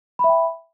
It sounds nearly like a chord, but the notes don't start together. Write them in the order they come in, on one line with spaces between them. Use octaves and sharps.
B5 E5 G5